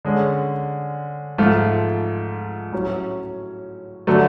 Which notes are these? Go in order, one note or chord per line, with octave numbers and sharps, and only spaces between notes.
D3 G#3 C#4
G#2 F3 A3 F4
A2 F#3 C#4
D3 F#3 A3